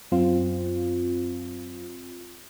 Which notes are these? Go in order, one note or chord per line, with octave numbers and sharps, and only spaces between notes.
F#2 C4 F4